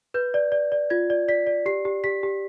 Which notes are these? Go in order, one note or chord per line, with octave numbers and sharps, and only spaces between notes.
B4 G6
D5
D5
D5
F4 G#6
D5
D5 B6
D5
G4 C7
G4
G4 B6
G4